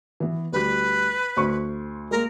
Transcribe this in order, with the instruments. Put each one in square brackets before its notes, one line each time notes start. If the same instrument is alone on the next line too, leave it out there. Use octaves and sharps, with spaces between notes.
[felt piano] E3 B3
[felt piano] D2 G3 F#6 [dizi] B4
[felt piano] D2 C5 C#6
[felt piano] G#3 A#3 [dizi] A#4